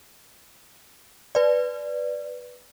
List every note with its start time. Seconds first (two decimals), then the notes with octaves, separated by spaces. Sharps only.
1.35 B4 D5